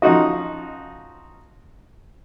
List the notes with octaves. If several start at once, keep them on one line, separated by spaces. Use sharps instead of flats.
F3 C#4 D#4 F4 F#4 D#5